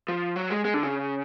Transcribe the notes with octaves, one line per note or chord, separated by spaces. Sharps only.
F3
F#3
G#3
G#3
D3
C#3